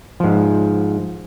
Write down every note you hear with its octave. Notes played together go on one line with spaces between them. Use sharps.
G#2 F3